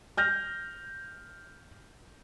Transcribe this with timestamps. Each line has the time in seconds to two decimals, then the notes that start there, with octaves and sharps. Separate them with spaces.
0.17 F6 G6 A#6